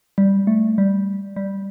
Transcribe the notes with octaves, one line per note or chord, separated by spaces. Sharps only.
G3
A3
G3
G3